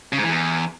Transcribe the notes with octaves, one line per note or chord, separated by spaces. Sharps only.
C#3
G#2
E3
E2